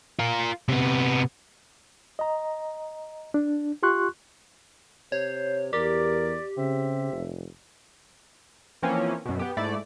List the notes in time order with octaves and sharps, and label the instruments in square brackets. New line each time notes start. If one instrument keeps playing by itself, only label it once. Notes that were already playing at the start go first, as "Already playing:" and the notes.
[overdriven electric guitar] F4 A#4
C3 B3
[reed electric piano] D#5 A#5
D4
F4 G4 C6 C#6 F#6
[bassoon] C3 [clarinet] C5 [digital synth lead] C#5
[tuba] E2 [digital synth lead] G4 [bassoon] A#4 [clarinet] D5
[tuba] C#3 [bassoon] C4 [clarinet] E5
[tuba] F1
[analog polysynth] E3 F3 A#3 C4 C#4
F#2 B2
B3 G4
G#2 A3 E4 D5